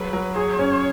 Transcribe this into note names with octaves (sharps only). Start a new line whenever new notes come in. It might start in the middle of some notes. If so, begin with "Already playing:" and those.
Already playing: F#3 G#4 B4
F#3
G#4 C#5
C#4